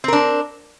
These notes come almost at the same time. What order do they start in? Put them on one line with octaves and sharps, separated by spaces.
C4 A#4 D4